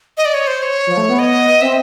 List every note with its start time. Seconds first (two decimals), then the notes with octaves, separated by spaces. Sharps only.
0.17 D#5
0.25 D5
0.34 C#5
0.47 C5
0.62 C#5
0.87 F3
0.97 A3
1.09 B3
1.19 D#5
1.61 C4 E5